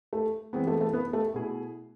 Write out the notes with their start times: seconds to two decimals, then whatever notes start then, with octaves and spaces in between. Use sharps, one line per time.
0.13 A3
0.53 E3 G#3 B3 C4
0.67 A3
0.81 A3
0.93 B3
1.13 A3
1.34 B2 A3 E4 G#4